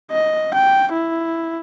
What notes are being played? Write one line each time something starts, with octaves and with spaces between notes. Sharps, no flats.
D#5
G5
E4